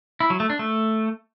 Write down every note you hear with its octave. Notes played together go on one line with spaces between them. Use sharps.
E4
F#3
A3
D4
A3